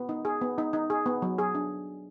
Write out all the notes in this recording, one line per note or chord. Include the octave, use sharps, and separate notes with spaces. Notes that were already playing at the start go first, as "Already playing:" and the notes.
Already playing: B3
D#4
G#4
B3
D#4
D#4
G#4
B3
F#3
G#4
D4